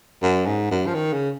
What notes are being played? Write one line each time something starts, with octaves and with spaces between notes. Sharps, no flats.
F#2
G#2
F#2
F3
D#3
C#3